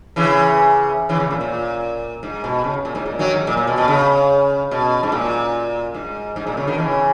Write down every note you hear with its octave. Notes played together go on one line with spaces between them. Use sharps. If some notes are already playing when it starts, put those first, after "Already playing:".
C#3 E3
C#3 E3
C#3
A#2
A#2
G#2
B2
C#3
A#2
G#2
A#2
D#3 F#3
G#2
A#2
A#2
B2
B2
C#3
B2
G#2
A#2
G#2
G#2
A#2
C#3
B2 D#3
C#3 E3